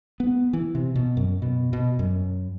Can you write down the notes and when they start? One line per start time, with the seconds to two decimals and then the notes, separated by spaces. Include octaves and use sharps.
0.20 B3
0.53 E3
0.75 C3
0.96 B2
1.17 F#2
1.42 B2
1.73 B2
1.99 F#2